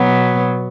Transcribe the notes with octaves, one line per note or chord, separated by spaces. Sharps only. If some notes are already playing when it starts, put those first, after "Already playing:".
Already playing: B2 F#3 B3